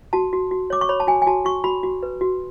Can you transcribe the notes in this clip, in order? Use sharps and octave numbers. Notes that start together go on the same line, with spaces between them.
F#4 A5
F#4
F#4
C#5 D6
C#6
C#5 B5
A5
F#4 G#5
G#5
F#4 A5
F#4 C#6
F#4 B5
F#4
B4
F#4